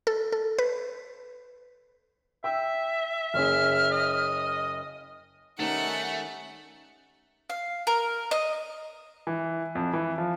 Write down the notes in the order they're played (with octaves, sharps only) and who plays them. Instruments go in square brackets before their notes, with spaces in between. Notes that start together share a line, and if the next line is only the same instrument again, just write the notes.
[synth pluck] A4
A4
B4
[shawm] E5 [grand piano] G5 E6
[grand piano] F#1 C#4 G#4 [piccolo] F6
[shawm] D#5
[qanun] D#3 G3 C#4 [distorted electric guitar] A3 [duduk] D#4 [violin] F#5
[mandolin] F5
A#4
D#5
[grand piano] E3
F2
E3
F3